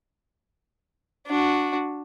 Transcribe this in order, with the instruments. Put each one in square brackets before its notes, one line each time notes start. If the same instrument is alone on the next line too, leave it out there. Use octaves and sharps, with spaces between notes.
[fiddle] D4 F#4